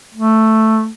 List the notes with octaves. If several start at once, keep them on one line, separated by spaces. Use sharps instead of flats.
A3